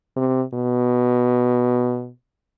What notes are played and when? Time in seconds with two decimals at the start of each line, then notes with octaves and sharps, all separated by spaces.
0.17 C3
0.54 B2